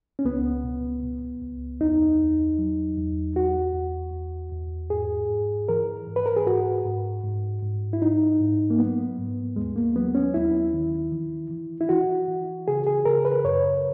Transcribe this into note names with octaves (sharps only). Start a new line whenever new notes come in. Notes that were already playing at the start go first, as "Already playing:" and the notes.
C#4
C#2 B3
B2
B2
C#2
E2 D#4
E2
F#3
E2
E2 F#4
E2
E2
E2
G#2 G#4
G#2
E3 A#4
G#2
B4
A#4
G#4
G#2 F#4
G#2
G#2
G#2
E4
G#2 D#4
G#2
A#3
F#3 B3
G#2
D#2 G#3
A#3
F#3 B3
C#4
D#2 E4
D#3
E3
E3
E4
E3 F#4
E3
C#3 G#4
G#4
C#3 A#4
B4
F#2 C#5